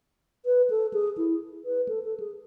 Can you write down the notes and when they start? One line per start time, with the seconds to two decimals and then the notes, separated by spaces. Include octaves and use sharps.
0.46 B4
0.70 A4
0.94 G#4
1.18 E4
1.65 B4
1.89 A4
2.04 A4
2.20 G#4